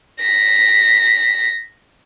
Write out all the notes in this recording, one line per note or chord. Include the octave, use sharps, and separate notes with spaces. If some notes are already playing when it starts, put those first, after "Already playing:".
A#6 B6